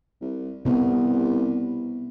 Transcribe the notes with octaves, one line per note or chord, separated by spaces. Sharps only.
C2
C2 C3 B3